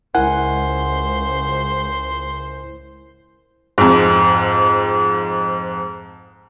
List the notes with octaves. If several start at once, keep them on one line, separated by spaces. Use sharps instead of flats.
C#2 E4 A#4 C5 F#5 G#5
F2 G#2